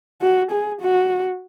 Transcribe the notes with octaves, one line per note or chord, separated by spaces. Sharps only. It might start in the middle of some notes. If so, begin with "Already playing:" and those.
F#4
G#4
F#4